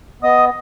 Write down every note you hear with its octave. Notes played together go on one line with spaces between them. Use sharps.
B3 D#5 D#6